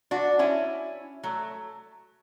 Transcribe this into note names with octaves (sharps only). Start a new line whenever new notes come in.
D4 F#4
C#4 E4
F#3 A3